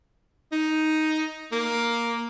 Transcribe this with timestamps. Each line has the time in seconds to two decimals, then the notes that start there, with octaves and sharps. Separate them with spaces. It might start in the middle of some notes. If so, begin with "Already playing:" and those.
0.52 D#4
1.52 A#3